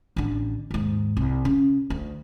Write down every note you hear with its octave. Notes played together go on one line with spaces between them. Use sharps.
A1 D3
D#2 G#2
C2
C#3
D2